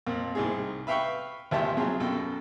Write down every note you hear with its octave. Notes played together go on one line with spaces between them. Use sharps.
F2 A#2
C2 G#2 G#4
B4 E5 F5 G5 B5 C#6
G#1 D#2 F3 G4 E5 A5
C3 F#3 F4 G#4
F#2 B2 A4 G5